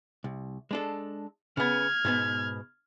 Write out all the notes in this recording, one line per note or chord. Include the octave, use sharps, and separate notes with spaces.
C2
G#3 D4 A4
C#3 B3 F6 G#6
G#2 B2 B3